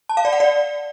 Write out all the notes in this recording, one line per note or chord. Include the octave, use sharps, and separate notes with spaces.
A5
F5
D5
F#5
D5